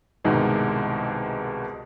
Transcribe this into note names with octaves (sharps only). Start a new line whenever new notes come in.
C2 G#2 B2 D#3 G#3